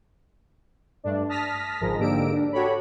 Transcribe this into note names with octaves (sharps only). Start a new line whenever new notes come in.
G2 A3 D4
A5 D#6 F6 A#6 B6
G1 G#2 F3 G#3 A#4 A#6
G#2 D3 A#3 G4 E6 D7
D4
F#4 G4 A4 C#5 B5